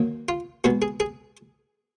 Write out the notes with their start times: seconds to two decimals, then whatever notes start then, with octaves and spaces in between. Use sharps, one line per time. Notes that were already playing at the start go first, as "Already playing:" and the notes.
Already playing: D#3 F#3 A#3
0.29 F4
0.64 B2 G#3 B3 F#4
0.82 G#4
1.00 G#4